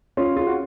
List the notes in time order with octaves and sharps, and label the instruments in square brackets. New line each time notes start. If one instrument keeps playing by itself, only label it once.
[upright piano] C#4 F4
F4 G#4
F#4